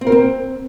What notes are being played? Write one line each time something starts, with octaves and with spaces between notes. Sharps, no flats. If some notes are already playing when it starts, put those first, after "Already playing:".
C4
A#4
C4